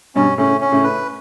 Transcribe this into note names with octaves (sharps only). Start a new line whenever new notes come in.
G2 B2 C#4
A2 C#3 C#4
C#4
A2 C#3
B4